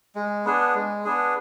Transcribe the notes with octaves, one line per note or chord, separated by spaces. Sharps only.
G#3
B3 D4 G#4
G#3
B3 D4 G#4